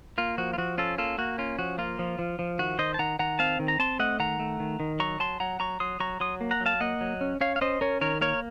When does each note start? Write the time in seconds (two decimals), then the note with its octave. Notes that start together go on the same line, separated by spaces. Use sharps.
0.18 A#3 F4
0.38 F3 F#4
0.53 F4
0.58 F3 F#4
0.78 C#4 F4 A4
0.98 A#3 F4 A4
1.18 A#3 F#4
1.38 C#4 F4
1.59 F3 F#4
1.78 A#3 F4
1.99 F3
2.19 F3
2.39 F3
2.59 D#3 F#4
2.79 D#3 C5 D#5
2.94 A5
2.99 D#3 F#5 A#5
3.19 D#3 F#5 A#5
3.39 C4 F5 A5
3.59 D#3
3.68 A#5
3.79 C4 A5 C6
3.99 A3 D#5 F#5
4.20 D#3 F#5 A#5
4.40 A3
4.60 D#3
4.80 D#3
5.00 F#3 A#5 C#6
5.19 F#3 A5 C6
5.40 F#3 F#5 A#5
5.60 F#3 A#5 C#6
5.80 F#3 C6 D#6
6.00 F#3 A#5 C#6
6.20 F#3 C6 D#6
6.41 A#3
6.51 F#5 A#5
6.61 F#3
6.66 F5 A5
6.81 A#3 D#5 F#5
7.01 F#3
7.21 C#4
7.41 C#4 C#5 F5
7.56 F5
7.61 C#4 C5 D#5
7.81 C#4 A#4 C#5
8.01 D#3 A#4 C#5
8.21 A#3 A#4 C#5